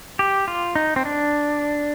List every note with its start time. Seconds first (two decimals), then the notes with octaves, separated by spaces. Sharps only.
0.19 G4
0.48 F4
0.75 D#4
0.96 C4
1.05 D4